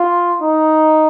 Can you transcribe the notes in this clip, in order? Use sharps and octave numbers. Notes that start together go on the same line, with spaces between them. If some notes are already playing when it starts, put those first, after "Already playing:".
Already playing: F4
D#4